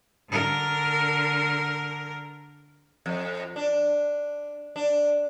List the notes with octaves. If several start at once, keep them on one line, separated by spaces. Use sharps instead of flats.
D3 A#4
F2
D4
D4